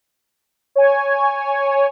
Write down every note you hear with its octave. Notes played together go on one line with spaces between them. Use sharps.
C#5 G#5